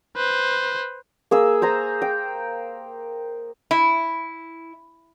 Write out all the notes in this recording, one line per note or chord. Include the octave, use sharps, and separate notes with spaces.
B4 C5
A#3 G#4 E6
C5 G#5 A#5
G5
E4